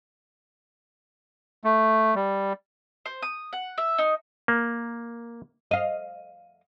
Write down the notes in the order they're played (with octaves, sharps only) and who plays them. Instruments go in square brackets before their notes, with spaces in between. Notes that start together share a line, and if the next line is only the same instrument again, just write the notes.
[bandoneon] A3
G3
[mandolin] C5
D#6
F#5
E5
D#4
[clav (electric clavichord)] A#3
[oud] D#5 F5